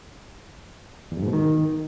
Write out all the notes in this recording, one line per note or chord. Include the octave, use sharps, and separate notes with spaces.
E2
F#2
G#2
B2
D#3